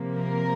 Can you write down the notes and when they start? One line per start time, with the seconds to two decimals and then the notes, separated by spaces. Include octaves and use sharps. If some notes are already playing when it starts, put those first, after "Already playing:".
Already playing: C3 F3 A#3
0.20 A#4